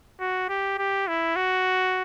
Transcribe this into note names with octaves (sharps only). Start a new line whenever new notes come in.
F#4
G4
G4
E4
F#4